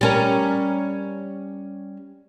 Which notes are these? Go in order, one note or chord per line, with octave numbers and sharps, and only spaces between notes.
G3 C#4 A#4